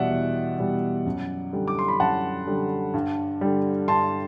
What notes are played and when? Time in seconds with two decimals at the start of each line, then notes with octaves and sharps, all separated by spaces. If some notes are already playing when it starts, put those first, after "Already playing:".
Already playing: E2 B2 G3 D5 E5 F#5
0.11 E2
0.59 B2 G3
1.06 F#2
1.53 D3 G3
1.68 D6
1.79 C6
1.88 B5
2.00 F#2 F#5 A5
2.47 D3 G3
2.94 G2
3.41 D3 G3
3.88 G2 A5 C6